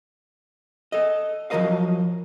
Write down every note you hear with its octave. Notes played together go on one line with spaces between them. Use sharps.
A4 D#5
F3 F#3 A3 A#4 D#5 F5